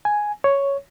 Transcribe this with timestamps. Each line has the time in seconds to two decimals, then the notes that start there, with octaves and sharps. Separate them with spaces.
0.05 G#5
0.44 C#5